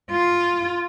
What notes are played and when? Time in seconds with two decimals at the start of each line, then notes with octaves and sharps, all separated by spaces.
0.12 F4